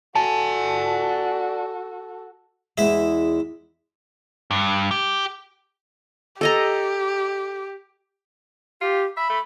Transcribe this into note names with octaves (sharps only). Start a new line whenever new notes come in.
F#4 A4 D5 G#5 A5
E2 G#3 E4 E5
G2
G4
G4 A4 D#5 A#5
F4 G4
E5 B5
A3